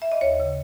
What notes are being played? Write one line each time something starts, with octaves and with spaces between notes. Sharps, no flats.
E5
D#5
D#2 C#5
C#3